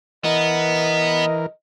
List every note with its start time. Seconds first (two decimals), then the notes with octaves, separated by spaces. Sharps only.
0.24 E3 B3 A#4 D#5